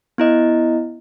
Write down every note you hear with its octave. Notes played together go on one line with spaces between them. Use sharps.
B3 E4 D#5